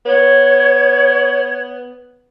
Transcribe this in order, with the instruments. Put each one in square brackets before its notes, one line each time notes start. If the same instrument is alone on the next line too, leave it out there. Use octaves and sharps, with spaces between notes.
[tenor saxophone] B3 [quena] C#5